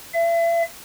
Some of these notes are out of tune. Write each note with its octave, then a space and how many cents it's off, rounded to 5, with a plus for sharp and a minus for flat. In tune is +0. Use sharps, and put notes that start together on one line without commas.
E5 +40